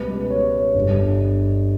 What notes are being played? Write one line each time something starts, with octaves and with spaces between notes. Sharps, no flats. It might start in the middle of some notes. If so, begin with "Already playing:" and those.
Already playing: C#2 B2 G3 B4
C#5
G1 G2 G3